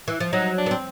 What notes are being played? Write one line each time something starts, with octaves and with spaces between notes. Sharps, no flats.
E3
F3
F#3 D#4
D4
B3
C4